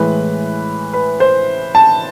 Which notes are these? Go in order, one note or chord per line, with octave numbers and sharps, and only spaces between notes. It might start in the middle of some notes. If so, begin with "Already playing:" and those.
Already playing: A2 E3 G#3 B4
B4
C5
A5